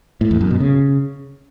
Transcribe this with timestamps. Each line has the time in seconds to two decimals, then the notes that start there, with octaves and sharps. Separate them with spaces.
0.21 A2
0.31 E2
0.41 F#2
0.51 B2
0.60 C#3